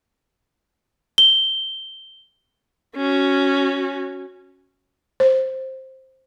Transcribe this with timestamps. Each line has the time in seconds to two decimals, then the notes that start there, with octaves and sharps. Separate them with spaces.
1.18 G7
2.96 C#4 F#4
5.20 C5